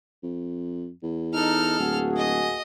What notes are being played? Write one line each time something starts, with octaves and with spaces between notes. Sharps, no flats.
F2
E2
D#4 A4 F6
D1 A#3 F#4 G#4
D#5